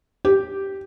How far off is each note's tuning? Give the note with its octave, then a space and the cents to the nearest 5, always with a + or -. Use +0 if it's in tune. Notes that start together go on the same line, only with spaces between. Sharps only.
G4 -5